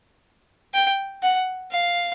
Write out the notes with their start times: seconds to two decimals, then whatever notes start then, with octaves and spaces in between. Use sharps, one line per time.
0.74 G5
1.23 F#5
1.71 F5